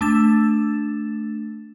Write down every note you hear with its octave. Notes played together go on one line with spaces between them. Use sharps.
A3 D4 A6 E7